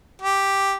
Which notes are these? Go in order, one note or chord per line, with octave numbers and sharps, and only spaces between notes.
G4